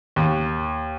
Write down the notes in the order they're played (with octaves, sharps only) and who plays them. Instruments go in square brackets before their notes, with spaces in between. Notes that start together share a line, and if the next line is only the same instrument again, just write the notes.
[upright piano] D#2